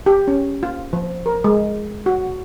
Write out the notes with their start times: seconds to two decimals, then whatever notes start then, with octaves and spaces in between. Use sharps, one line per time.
0.06 G4
0.28 C#4
0.63 F4
0.93 F3
1.26 A#4
1.44 G#3
2.06 F#4